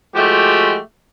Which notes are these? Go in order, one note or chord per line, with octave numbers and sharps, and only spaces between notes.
F3 G#3 A3 F#4 G4